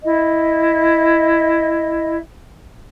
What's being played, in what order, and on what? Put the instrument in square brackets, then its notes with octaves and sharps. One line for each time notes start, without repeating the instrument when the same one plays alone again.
[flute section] E4 D#5